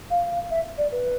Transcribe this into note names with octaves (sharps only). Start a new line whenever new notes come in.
F5
E5
D5
B4